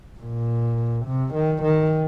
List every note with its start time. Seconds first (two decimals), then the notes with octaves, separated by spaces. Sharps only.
0.20 A#2
1.06 C3
1.34 D#3
1.63 D#3